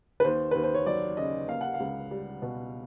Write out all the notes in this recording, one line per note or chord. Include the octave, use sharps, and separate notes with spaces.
B4
D#2 C5
D#2 B4
C5
C#5
F#3 D5
C#3 D#5
A#3 F5
F#5
F5
C#2
G3
B2